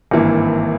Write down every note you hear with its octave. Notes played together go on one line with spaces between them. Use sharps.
G#1 G2 E3 A#3 E4